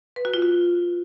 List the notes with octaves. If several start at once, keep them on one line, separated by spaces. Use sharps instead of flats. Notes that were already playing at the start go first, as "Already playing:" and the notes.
B4
F#4
F4
F#4